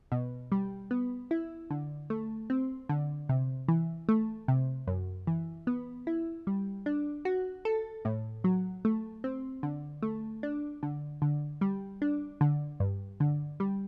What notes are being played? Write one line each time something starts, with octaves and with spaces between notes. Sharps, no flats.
B2
G3
B3
E4
D3
A3
C4
D3
C3
E3
A3
C3
F#2
E3
B3
E4
G3
D4
F#4
A4
A2
F#3
A3
C4
D3
A3
D4
D3
D3
G3
D4
D3
G2
D3
G3